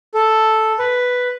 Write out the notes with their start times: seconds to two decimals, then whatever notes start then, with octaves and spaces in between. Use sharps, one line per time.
0.14 A4
0.79 B4